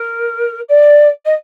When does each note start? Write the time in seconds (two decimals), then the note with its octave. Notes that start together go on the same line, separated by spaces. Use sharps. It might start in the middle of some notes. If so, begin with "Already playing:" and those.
Already playing: A#4
0.68 D5
1.25 D#5